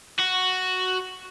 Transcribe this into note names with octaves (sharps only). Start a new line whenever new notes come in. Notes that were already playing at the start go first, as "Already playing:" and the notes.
F#4